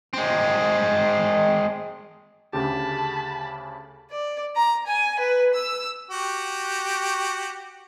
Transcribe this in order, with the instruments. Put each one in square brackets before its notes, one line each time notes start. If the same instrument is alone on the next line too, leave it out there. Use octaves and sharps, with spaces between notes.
[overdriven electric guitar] G#3 C4
[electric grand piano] D2 C#3 G4 [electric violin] A5 B5
[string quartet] D5
A#5
G#5
B4
E6
[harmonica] F#4 G4